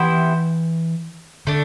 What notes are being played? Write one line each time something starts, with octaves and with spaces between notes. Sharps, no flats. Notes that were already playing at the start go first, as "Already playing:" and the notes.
Already playing: E3 B3 E4 G4 C5
D3 A3 D4